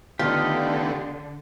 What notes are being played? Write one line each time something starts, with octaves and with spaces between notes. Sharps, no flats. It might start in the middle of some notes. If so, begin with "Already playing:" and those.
D3 D#3 A3 B3 F4 G4 D#5